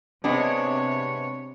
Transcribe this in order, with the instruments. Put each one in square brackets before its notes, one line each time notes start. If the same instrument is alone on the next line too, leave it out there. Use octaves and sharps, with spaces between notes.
[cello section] C3 C#5 [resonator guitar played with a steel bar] G#3 B3 D4